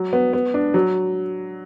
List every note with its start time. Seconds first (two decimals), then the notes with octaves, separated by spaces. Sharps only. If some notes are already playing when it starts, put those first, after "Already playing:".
Already playing: F#3
0.13 B3
0.33 B3
0.54 D4
0.74 F#3